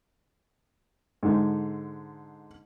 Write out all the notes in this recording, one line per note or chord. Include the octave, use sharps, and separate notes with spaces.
G#2 D3